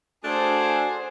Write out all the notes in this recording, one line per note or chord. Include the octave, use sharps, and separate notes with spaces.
A3 D4 F#4 G#4 A4 C5 G#5